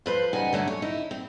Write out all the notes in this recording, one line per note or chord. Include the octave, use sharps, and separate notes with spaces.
F3 B4 C5
C#3 G3 D#4 F#5 G#5
D3 F#3 A3 C#4
C#5
D#4 E4
C4